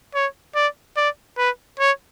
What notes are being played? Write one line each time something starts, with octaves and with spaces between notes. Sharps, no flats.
C#5
D5
D5
B4
C#5